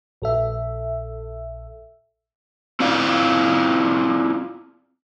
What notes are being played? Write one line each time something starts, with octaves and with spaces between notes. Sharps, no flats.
A#1 A4 E5
C4 E4 F4 D5 F5